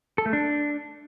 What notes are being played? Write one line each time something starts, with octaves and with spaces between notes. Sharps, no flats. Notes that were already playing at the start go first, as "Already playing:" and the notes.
A4
A3
D4